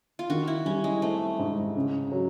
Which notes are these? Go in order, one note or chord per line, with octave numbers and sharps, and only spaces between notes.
F4
D#3 F#4
E4
G3 C#4
G#3
A3 C4
G#2
C#3
F#3